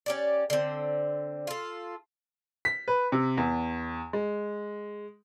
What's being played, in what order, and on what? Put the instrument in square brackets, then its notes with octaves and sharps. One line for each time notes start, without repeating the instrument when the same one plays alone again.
[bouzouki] C#4 G4 D5
D3 C4
F4 A4
[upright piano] B6
B4
C3
E2
G#3